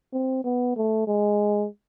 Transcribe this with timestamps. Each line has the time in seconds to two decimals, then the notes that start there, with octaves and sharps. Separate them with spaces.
0.13 C4
0.44 B3
0.76 A3
1.07 G#3